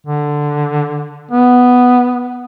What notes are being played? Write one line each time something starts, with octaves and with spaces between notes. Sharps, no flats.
D3
B3